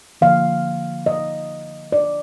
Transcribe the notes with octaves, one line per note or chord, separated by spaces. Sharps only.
D3 F3 A#3 F5
D#5
D5